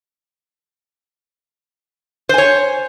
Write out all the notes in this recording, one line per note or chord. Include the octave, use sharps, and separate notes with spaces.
C5 C#5 G#5